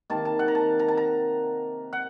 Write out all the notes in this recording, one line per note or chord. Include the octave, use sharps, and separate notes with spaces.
C3 D#3 A#3 A5
A5
F#5
A#5
A5
A#5
A5
A#5
F#5